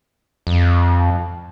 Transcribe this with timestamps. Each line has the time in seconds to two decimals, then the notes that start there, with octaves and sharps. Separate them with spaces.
0.47 F2